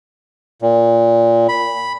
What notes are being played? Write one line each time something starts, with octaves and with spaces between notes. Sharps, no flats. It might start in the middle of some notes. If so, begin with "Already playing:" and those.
A#2
B5